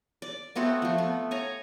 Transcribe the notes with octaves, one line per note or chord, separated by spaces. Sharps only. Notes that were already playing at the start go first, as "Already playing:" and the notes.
D5
A3 B3 C4 F#4
F3 A3
B3
C#5 G#5 A#5